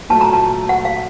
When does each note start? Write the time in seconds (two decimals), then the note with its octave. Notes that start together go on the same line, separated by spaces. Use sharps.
0.10 A#2 F#3 A3 A5
0.21 A#5
0.33 A5
0.69 F#5
0.85 F5